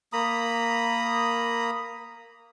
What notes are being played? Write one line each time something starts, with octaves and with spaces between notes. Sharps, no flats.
A#3 A#5 B5 D#6